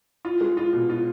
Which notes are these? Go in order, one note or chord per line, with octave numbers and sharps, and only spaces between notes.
F4
G#3
F4
B2
F4